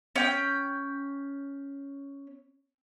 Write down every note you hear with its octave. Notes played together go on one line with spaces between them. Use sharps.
C#4 G5